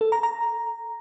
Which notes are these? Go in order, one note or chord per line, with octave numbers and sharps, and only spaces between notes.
A4
A#5
A#5